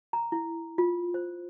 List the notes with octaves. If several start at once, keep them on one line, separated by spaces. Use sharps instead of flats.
A#5
E4
F4
C5